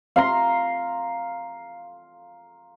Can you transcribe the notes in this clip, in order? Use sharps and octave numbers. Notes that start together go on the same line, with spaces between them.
F5 A#5 C6